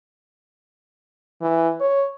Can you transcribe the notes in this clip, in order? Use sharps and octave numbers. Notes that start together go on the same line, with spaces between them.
E3
C#5